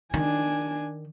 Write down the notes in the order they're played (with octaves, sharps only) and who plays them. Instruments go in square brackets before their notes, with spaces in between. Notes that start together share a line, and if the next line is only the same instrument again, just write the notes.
[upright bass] D#3 [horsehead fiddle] D4 G#5